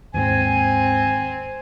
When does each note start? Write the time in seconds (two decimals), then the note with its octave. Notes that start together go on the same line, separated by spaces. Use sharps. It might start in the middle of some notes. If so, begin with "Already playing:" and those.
0.14 D#2 G#2 C4 G#5